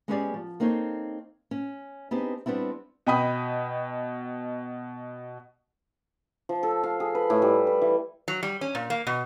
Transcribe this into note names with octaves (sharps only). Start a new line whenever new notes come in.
G#3 B3 C#4 G4 G#4 D5
F3
A#3 C4 D#4 A4 C#5
C#4
B3 C4 D4 D#4 G4 G#4
G3 B3 C4 D4 E4
B2 D#5 G5 B5 D#6
F3
A4
F5
G#4
B4
A2
G3
B4
E3
F#3
G3
C#4
A#2
A#3
B2